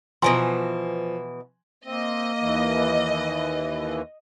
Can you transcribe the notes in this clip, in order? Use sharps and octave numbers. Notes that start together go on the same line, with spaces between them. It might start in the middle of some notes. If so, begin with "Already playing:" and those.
B2 E3 F3 G#5 A#5 C6
A#3 C4 D#5
D#2 E3